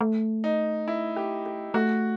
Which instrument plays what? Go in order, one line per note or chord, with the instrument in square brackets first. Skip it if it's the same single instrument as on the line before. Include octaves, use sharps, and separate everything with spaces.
[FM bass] A3
[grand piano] D#4
E4
G4
G4
[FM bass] A3 [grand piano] F#4